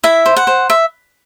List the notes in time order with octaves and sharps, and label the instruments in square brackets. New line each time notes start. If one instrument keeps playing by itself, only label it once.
[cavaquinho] E4 E5
C5
F#5
C5
E5